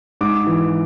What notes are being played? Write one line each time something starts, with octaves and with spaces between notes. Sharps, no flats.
G#2 D6
E3